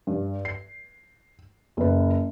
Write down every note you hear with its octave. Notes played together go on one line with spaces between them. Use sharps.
G2
C7
F#1 B4